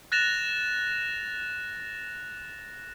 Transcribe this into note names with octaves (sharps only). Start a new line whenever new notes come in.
F#6 A6 A#6 E7 F7